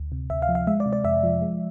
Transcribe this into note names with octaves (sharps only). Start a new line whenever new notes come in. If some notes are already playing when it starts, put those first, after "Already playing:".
Already playing: D2
C3
D2 E5
F5
F3
F5
G#3 E5
D5
C3
D5
F2 E5
F3
G#3